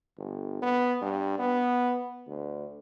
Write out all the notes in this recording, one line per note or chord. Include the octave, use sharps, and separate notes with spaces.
G1
B3
G2
B3
D2